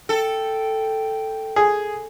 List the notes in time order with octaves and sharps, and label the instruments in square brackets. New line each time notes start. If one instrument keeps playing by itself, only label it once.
[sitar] A4 [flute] G5
[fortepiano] G#4